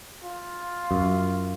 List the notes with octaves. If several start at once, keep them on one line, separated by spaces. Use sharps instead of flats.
F4
F#2